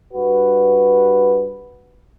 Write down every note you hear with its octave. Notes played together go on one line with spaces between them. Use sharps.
G2 F#4 B4